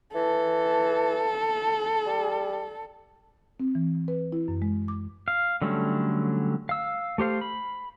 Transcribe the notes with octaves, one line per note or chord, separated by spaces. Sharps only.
E3 A4
G3
C4
E3
B4
E4
F#2
G#3
D6
F5
D3 F#3 G3 A3 C#4
F5 E6
A3 G4 C5 F5
B5